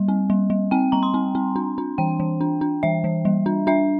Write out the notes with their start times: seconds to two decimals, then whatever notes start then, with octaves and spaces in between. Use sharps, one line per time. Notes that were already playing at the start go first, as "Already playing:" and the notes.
Already playing: G3
0.08 C4
0.30 G3
0.50 G3
0.71 C4 G5
0.92 G3 A#5
1.03 C6
1.14 C4
1.35 C4
1.56 D4
1.78 D4
1.98 E3 G5
2.20 E3
2.41 D4
2.61 D4
2.83 E3 E5
3.04 E3
3.25 G3
3.46 D4
3.67 D4 E5